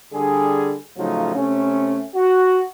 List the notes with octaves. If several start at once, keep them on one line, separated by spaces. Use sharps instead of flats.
D3 G3 G#4
A2 C#3 F3 F#3 D#4
C3 A3 C#4
F#4